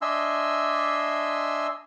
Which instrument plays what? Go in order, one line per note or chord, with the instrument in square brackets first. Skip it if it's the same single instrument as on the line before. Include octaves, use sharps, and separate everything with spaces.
[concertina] D4 D#5 E5 G#5 C6 E6